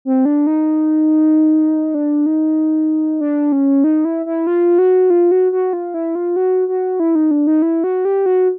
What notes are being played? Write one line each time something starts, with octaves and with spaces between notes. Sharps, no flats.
C4
D4
D#4
D4
D#4
D4
C#4
D#4
E4
E4
F4
F#4
F4
F#4
F#4
F4
E4
F4
F#4
F#4
E4
D#4
D4
D#4
E4
F#4
G4
F#4